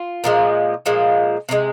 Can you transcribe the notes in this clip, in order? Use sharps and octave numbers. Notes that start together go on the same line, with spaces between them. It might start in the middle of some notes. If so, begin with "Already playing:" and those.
Already playing: F4
A#2 F3 G#3
A#2 F3 G#3
C3 F3 G#3